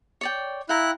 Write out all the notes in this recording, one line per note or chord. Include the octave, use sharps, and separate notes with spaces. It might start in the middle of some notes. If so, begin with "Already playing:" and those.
C#5 D5 G5
E4 F5 G5 A#5 F#6